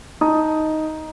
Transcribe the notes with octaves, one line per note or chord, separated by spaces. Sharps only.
D#4 A5 D#6